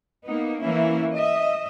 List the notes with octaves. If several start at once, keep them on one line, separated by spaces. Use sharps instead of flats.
A#3 B3 D#4
E3 A#3 C#4 E4
D#5 E5